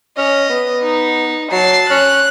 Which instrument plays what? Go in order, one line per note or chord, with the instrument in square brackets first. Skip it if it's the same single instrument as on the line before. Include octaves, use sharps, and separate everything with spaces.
[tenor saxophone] C#4 [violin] D#5
[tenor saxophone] B3
[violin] D#4
[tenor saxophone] F#3 [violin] A5 C7
[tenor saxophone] C#4 [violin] F#6